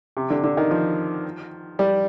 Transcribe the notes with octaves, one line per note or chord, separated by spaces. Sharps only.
C3
D3
D3
D#3
F3
G3